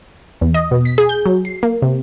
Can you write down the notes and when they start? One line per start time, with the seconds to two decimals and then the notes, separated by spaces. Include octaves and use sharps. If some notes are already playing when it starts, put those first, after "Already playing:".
0.41 E2
0.54 D#5
0.71 B2
0.85 B6
0.98 G#4
1.09 G6
1.26 F#3
1.45 C7
1.63 A#3
1.82 C3